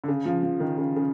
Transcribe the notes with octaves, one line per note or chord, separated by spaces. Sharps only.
D3
C#3
F3
F3
D#3
C#3
C#3